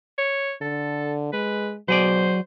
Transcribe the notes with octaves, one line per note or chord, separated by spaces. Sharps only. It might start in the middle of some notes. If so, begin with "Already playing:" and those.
C#5
D3 A4
G#3 B4
B2 F#3 G#4 C5 D5